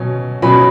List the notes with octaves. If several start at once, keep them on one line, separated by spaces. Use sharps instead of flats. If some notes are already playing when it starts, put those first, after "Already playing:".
Already playing: B2 F#3 C#4
B2 F#3 C#4 B5